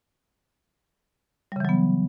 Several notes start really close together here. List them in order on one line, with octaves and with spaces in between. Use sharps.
G3 C#3 E3 F#3 B3